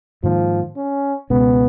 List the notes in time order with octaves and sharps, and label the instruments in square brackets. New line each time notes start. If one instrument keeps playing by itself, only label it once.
[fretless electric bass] G#2 D#3 A#3 [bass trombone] F3
[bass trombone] C#4
[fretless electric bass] C#2 B2 G#3 C#4 [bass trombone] B3